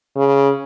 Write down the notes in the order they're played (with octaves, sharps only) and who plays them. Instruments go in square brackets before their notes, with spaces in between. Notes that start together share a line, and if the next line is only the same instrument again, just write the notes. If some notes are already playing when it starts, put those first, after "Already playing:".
[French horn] C#3